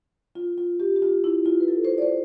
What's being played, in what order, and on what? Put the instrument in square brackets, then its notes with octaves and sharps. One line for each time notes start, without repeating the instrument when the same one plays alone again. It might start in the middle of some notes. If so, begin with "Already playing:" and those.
[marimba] F4
F4
G4
G4
F4
E4
F4
B4
A4
C5
D5
C5